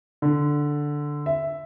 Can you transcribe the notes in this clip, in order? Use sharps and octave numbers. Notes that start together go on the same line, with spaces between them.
D3
E5